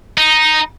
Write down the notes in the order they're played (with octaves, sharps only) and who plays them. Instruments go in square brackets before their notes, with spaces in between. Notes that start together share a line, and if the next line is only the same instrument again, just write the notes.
[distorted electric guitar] D#4